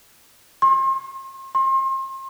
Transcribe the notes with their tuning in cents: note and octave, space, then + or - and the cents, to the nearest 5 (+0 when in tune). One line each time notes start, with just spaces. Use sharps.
C6 +40
C6 +35